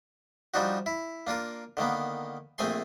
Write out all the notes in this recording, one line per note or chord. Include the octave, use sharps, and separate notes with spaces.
F3 G3 D4 D#4 F#4
E4
A#3 D4 F4 A#4
D3 D#3 A#3 B3
A#1 A3 C4 G#4 G#5 C6